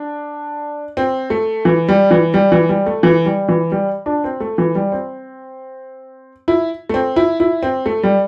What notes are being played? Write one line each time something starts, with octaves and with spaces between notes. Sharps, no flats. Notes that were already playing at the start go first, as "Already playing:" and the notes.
Already playing: D4
C4
A3
E3
G3
E3
G3
E3
G3
A3
E3
G3
E3
G3
D4
C4
A3
E3
G3
C4
E4
A3
C4
E4
E4
C4
A3
G3